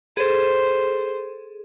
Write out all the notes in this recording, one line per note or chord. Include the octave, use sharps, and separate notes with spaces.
G#4 A4 C5